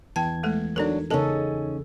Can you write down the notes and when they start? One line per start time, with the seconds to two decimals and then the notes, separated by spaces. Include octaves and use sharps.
0.16 E2 E3 G5 A5 G#6
0.43 G#3 A3 A4
0.76 F#3 D4 D#4 A4 A#4
1.11 C#3 C#4 D#4 A4 A#4 D#5 A5